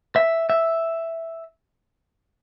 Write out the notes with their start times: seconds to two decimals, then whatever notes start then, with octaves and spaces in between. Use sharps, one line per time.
0.16 E5
0.50 E5